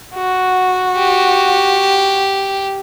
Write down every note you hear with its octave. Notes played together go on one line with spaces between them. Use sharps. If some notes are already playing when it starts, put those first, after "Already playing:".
F#4
G4